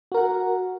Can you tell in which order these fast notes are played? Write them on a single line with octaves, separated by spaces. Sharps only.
F#4 A#4 F#5